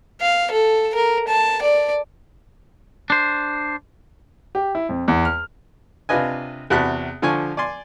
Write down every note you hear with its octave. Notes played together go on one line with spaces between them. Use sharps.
F5
A4
A#4
A5
D5
D4 C5
G4
E4
F2
E2
F6
C3 D4 F4 B4 D#5 G#5
E2 C3 F#4 A5 B5 F#6
D3 F3 G#5 C#6
D5 G#5 C6